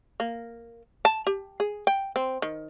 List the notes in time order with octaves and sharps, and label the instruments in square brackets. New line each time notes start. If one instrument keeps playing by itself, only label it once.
[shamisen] A#3
A5
G4
G#4
G5
C4
D#3